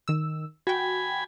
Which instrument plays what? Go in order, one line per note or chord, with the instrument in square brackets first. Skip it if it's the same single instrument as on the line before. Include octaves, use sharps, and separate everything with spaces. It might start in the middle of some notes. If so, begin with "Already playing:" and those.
[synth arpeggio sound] D#3 E6
[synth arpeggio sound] F#4 G5 [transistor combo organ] G#5 B5